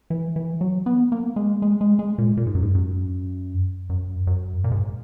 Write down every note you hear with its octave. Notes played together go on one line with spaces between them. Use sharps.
E3
E3
F#3
B3
A#3
G#3
G#3
G#3
G#3
A#2
A#2
G#2
F#2
G#2
F#2
F#2
F#2
A#2
G#2